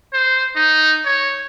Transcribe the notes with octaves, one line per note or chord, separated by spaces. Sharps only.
C5
D#4
C#5